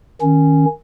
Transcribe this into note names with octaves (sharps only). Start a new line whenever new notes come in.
D#3 C#4